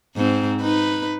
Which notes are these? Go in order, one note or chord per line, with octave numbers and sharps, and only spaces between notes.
G#2 C4
D#4 B4